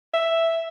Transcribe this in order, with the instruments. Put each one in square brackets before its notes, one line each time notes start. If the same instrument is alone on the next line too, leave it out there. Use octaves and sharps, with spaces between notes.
[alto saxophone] E5